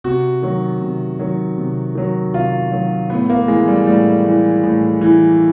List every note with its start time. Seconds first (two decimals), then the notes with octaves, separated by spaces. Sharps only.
0.04 C3 F#4
0.42 D#3 F#3
0.81 C3
1.19 D#3 F#3
1.58 C3
1.95 D#3 F#3
2.33 C3 F4
2.72 D#3 F#3
3.10 A2 B3
3.30 A#3
3.48 E3 G#3
3.68 G3
3.87 A2 G3
4.25 E3
4.63 A2
5.01 E3